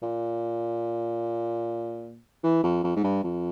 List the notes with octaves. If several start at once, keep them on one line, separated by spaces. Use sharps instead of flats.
A#2
E3
F2
F2
G#2
G2
F2